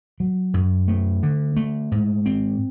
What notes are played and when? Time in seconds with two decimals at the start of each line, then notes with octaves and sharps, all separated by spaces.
0.20 F#3
0.54 F#2
0.88 A3
1.23 D3
1.56 A3
1.92 G#2
2.26 C4